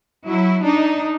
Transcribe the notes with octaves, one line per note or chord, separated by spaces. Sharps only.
F#3 E4
D4 D#4